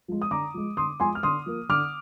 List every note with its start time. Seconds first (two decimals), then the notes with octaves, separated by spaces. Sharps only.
0.08 F3 G#3
0.22 D#6
0.31 D3 A#5 D6
0.54 F3 G#3
0.77 D3 C6 D#6
1.00 F3 G#3 G#5 C6
1.15 F6
1.23 D3 C6 D#6
1.46 F3 A#3
1.69 D3 D6 F6